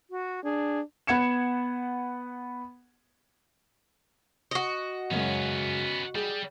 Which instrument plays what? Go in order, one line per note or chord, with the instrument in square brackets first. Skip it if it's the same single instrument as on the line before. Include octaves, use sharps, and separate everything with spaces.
[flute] F#4
[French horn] D4 [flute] G#4
[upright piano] B3 F#5 G#6 C#7 E7
[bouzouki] F#4 D#5
[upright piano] F#2 C#3 G#3 [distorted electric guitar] B3 C#4
[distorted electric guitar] G3 [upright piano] G#4